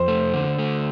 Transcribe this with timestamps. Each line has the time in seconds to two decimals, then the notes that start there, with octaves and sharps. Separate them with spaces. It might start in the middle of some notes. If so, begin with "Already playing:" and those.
Already playing: F2 C5
0.08 A3
0.34 D3
0.59 A3